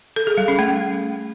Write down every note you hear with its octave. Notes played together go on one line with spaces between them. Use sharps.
A4
G#4
G3
C#4
A3